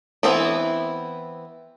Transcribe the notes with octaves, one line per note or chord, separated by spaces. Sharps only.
E3 B3 C4 E4